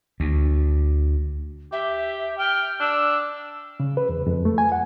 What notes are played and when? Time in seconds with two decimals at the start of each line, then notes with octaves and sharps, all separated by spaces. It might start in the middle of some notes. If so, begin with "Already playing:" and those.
0.20 D2
1.72 G4 E5
2.39 G5 F6
2.80 D4 E6
3.80 C#3
3.97 B4
4.09 E2
4.27 F2
4.45 A3
4.58 G#5
4.72 F#5